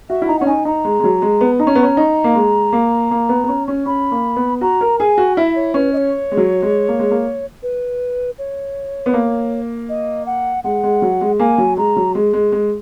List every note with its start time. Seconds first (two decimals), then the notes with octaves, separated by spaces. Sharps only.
0.09 F#4 E5
0.22 E4
0.28 D#4 A#5
0.39 C#4 F#5
0.47 D#4 G#5
0.65 D#4 A#5
0.85 G#3
1.00 G#3
1.04 F#3
1.22 G#3
1.41 B3
1.59 D#4 A#5
1.67 C#4
1.75 B3
1.83 C#4
1.97 D#4
2.24 A#3
2.35 G#3
2.73 A#3
3.11 A#3
3.29 B3
3.44 B3
3.48 C#4
3.68 C#4
3.86 C#4 B5
4.11 A#3
4.36 B3
4.61 F#4 A#5
4.81 A#4
4.99 G#4 G#5
5.18 F#4
5.37 E4 E5
5.55 C#5
5.74 C#4 B4
5.93 D#5
5.97 C#5
6.32 G#3
6.37 F#3
6.62 G#3
6.88 A#3
6.99 G#3
7.11 A#3
7.63 B4
8.38 C#5
9.06 B3
9.13 A#3
9.89 D#5
10.26 F#5
10.64 G#3 F#5
10.83 G#3
11.02 F#3
11.21 G#3
11.39 A#3 G#5
11.58 F#3
11.77 G#3 A#5
11.96 F#3
12.15 G#3
12.33 G#3
12.52 G#3